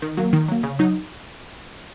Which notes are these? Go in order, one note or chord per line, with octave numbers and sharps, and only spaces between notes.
D#3
F#3 A#3
D#3
F#3 A#3
C#3
F#3 D#4